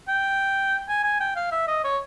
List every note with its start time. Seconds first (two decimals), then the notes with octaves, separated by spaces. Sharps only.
0.08 G5
0.88 G#5
1.04 G#5
1.20 G5
1.36 F5
1.52 E5
1.68 D#5
1.84 C#5